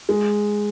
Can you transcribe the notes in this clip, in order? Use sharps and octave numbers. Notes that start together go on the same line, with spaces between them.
G#3